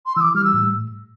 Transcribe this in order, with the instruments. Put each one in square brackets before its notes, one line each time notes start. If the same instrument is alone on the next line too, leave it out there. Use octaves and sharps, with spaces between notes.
[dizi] C6
[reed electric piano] E3 [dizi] D6 E6
[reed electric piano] G3 [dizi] F6
[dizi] E6
[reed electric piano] A2